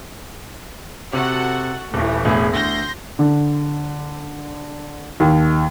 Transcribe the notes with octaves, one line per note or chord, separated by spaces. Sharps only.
C3 F#4 A4 F#5
D#1 E3 A3
E1 A2 G#4
D2 C6 G6 A#6
D3
D#2